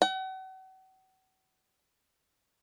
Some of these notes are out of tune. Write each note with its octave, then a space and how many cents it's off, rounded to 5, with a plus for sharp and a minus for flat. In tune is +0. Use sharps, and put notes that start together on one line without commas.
F#5 +40